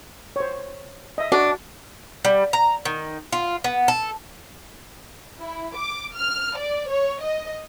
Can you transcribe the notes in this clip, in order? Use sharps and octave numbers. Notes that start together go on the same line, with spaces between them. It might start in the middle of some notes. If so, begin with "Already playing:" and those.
C5 C#5
D#5 E5
D4 F#4
G3
A#5
D#3
F4
B3
A4
E4
D6
F6
D5
C#5
D#5